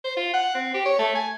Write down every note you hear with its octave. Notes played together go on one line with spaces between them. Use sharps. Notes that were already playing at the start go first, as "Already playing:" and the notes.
C5
F4
F#5
C4
G4
C#5
A3
G#5